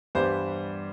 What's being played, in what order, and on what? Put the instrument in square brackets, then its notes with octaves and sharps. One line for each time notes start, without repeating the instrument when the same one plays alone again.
[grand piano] G2 E3 G3 B3 C5